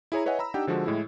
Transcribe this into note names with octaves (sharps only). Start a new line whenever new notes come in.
E4 G#4 C#5 A#5
B4 C#5 D#5 E5 F#5 G#5
A#5 B5 E6
D4 D#4 G4 F#5 G5
D3 F3 G#3 F#4
A2 G#3 E4